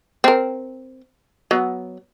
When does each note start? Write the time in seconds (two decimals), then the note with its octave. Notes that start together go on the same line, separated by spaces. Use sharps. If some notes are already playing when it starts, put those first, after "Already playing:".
0.24 C4 A#4
1.51 F#3 B3